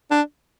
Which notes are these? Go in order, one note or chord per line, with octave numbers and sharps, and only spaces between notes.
D4